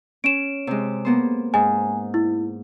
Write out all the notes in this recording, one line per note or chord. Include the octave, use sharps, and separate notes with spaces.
C#4 D7 E7
C3 G#3
A#3 B3 C5
G#2 G#5
E4